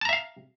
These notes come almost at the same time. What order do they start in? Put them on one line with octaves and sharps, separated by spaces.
A5 A#5 E5 F5